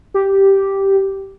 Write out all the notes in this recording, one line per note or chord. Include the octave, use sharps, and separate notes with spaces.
G4